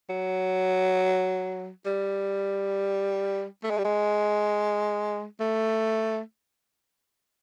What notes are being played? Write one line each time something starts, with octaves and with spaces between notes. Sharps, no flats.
F#3
G3
A3
G#3
G3
G#3
A3